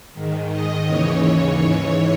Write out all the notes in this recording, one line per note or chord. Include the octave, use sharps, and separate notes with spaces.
G#2 D#3
D#5
D#2 C#3 E3 C#5
G#2 E3